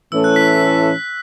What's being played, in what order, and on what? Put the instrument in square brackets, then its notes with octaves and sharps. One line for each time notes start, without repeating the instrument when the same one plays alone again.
[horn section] A2 E3 A3 C#4 A4 [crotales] E6
[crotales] F#6
B6
B6